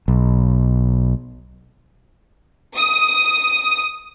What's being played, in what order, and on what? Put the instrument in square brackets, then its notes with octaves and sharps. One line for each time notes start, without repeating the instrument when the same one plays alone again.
[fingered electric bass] B1
[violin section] D#6